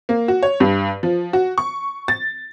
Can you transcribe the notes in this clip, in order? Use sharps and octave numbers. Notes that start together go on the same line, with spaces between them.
A#3
F#4
C#5
G2
F3
F#4
C#6
A6